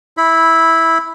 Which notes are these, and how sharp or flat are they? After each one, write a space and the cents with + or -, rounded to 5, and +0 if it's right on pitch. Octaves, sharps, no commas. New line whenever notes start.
E4 -10 B5 +0